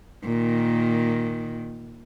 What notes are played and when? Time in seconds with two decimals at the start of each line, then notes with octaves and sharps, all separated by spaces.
0.24 A#2 D#3